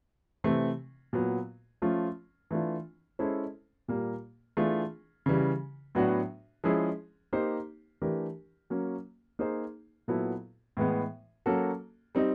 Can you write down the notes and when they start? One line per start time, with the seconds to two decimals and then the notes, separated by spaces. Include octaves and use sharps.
0.44 C3 E3 A3 C4
1.13 A#2 F#3 B3
1.82 F3 A3 C#4 F4
2.51 E3 A3 D4 F4
3.19 G#3 C#4 E4 A4 C5
3.88 A#2 G3 A#3
4.57 E3 A3 D4 F4 G#4
5.26 C#3 E3 G3
5.95 A2 F#3 B3 D4 F#4
6.64 F3 G#3 C#4 E4 G#4
7.33 A#3 D#4 G4 C5
8.02 E3 A3 D4 G4 A#4
8.70 F#3 A#3 C#4
9.39 A#3 D#4 G#4 C5
10.08 A#2 F#3 B3 E4 A4
10.77 A2 E3 G#3 B3
11.46 F#3 A#3 C#4 F#4 A4
12.15 G3 C4 D#4